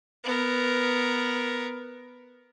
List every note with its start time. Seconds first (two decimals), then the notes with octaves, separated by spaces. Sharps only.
0.24 B3 A#4